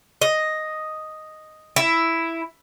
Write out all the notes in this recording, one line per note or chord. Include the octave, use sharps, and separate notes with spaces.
D#5
E4